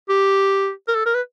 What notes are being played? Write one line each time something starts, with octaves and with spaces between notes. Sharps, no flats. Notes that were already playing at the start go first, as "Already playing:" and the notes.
G4
A#4
A4
A#4
B4